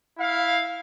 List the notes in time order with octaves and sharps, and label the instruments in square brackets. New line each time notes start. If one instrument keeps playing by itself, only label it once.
[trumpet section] E4 F5